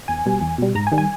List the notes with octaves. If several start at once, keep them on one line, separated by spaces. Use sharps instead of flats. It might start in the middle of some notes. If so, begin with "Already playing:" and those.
E2 G#5
B2 G3
E2
B2 G3
G#2 A#5
G#5
D#3 G3
G#5